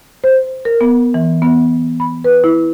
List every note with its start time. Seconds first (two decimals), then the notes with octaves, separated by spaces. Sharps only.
0.24 C5
0.65 A#4
0.81 B3
1.14 E3
1.42 B3
2.00 B5
2.24 B4
2.44 E4